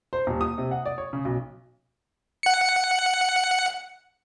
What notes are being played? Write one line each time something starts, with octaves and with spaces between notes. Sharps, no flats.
C5
D#1
D#6
C3
F#5
D5
C#5
C#3
B1
F#5 C#7